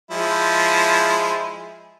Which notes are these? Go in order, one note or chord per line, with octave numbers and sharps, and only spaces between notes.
F3 G#3 E4